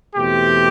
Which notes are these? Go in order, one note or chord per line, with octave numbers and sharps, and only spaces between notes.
E2 B2 A3 C4 G4